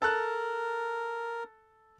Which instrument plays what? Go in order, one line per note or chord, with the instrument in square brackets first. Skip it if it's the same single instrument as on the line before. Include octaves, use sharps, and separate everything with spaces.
[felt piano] A4 A5 F#6 [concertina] A#4